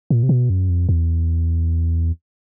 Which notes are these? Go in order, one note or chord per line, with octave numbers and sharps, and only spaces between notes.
A#2
C3
B2
F#2
F2
E2